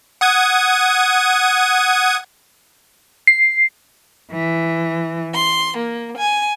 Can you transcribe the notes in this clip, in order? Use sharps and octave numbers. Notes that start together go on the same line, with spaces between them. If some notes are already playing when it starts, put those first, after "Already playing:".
F#5 D#6 G#6
C7
E3
C6
A#3
G#5